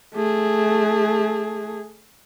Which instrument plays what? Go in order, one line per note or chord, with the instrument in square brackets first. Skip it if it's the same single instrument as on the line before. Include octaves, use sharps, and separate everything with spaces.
[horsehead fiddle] A3 G#4